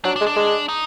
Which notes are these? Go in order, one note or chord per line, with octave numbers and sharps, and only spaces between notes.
F#3 D4
D4
G#3
D4
G#3
D#4